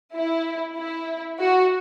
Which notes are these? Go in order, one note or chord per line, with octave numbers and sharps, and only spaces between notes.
E4
E4
F#4